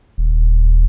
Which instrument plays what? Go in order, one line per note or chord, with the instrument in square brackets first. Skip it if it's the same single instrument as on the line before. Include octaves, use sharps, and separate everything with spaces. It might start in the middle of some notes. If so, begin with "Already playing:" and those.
[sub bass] D#1